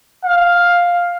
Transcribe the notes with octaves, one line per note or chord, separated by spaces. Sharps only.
F5